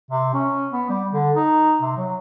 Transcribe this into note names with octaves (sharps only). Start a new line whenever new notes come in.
C3
C#4
B3
G3
D3
D#4
C3
F#3